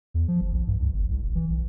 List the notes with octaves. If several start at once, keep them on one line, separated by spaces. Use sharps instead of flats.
E2
F3
F#1
B1
G2
C#2
G1
C2
E1
E3
B1